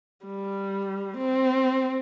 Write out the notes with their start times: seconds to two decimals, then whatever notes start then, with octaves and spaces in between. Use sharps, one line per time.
0.25 G3
1.18 C4